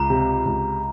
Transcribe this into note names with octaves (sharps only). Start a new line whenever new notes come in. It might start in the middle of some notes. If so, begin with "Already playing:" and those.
Already playing: C#2 A#5
C3
C#2